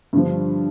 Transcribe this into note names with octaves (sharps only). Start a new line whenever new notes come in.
G2 D3 F3